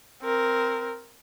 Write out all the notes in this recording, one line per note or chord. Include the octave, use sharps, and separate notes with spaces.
C4 A#4